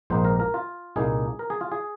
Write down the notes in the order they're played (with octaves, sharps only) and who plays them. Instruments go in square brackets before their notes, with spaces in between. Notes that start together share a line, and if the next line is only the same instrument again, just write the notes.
[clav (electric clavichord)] A#1 G#2 F3 A#3 D#4 C5
A#4
A#4
F4
C2 A#2 A#3 D#4 G#4
A#4
G#4
F4
G#4